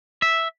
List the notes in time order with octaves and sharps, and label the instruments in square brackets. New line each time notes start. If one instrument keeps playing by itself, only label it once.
[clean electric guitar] E5